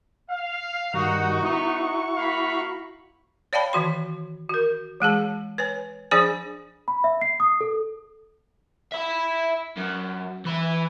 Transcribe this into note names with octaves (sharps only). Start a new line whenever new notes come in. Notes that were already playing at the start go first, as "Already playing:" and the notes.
F5
G2 D#3 D#4 F#4
B3 D#4 E4 F#4 C#6
A#3 F5 B5
C#5 D5 F5 G5 A5 B5
D#3 E3 F#4 C6
F#4 A#4
E3 G#3 G#4 A5
B4 C#5 G#5
F3 D4 G#4 C5 G#5
B5
E5
C7
D#6
A4
E5 B5
F#2
E3 B5